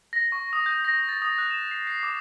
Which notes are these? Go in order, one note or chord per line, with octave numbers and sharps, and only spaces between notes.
A#6
C#6
D#6
G6
A#6
A6
D#6
F#6
E7
C7
C7
D6